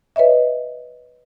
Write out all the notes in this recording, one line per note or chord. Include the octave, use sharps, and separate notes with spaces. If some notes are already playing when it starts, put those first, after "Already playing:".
B4 C#5 D#5 E5